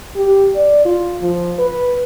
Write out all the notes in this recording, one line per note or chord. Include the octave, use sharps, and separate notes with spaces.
G4
D5
F4
F3
B4